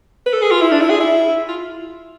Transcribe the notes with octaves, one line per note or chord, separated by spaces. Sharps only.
B4
A4
G#4
F4
E4
D4
E4
G#4
E4
F4